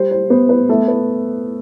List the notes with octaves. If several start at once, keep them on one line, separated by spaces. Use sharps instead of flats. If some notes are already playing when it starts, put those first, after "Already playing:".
Already playing: G3 C5
C5
B3 C5
B4
A3 A4
B4